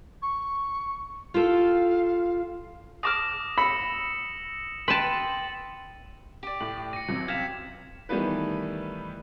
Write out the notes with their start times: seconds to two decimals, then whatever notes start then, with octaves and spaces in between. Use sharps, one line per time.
0.22 C#6
1.34 F4 G4 A4 F5
3.03 A5 D6 D#6 F6 A#6 E7
3.58 B5 E6 C#7
4.88 B4 G5 A5 C6 A6 D#7 F#7
6.43 G4 D5
6.61 A2 F#7
6.93 A#6 C#7 D#7
7.08 A1 C3 F#3
7.28 F5 G5 G#6 B6 E7
8.09 D#3 E3 G3 A3 B3 B4